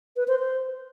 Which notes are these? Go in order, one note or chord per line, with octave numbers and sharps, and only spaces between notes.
B4
C5
C5